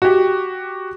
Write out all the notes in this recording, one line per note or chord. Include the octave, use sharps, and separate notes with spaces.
F#4 G4